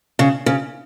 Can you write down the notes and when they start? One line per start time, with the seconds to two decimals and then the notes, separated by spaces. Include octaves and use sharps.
0.19 C#3
0.46 C#3